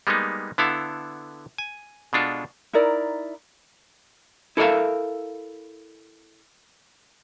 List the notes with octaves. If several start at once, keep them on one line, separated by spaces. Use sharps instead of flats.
G3 G#3 A#3 B3 D#4
D3 B3 E4 A4 F5
G#5
B2 G#3 D4 F4 A4
D#4 E4 A#4 D5
E4 A4 A#4 D5 E5 F5